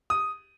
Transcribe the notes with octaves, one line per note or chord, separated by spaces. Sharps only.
D#6